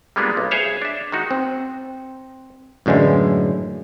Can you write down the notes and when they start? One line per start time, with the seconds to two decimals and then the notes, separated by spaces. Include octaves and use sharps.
0.16 G3 G#3 A#3 B3 D4 F4
0.37 B1
0.51 G#4 C5 C#5 E5 F5
0.82 D4 E5
1.12 D#3 G#3 D#4 F#4
1.31 C4
2.86 F#2 A2 D3 E3 G#3